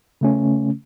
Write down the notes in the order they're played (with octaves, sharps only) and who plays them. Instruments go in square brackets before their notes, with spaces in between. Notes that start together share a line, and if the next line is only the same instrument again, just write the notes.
[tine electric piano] C#3 A3 C#4